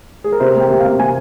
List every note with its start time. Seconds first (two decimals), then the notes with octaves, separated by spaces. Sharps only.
0.24 G#4
0.32 A#4
0.40 C3 C5
0.55 A#3
0.60 G5
0.70 C3
0.80 F5
0.85 C3
0.99 C3 G#5